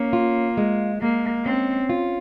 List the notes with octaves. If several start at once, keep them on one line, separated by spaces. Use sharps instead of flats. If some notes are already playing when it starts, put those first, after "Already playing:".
Already playing: A#3 C#4
F4
G#3
G#3 A#3
C4 C#4
F4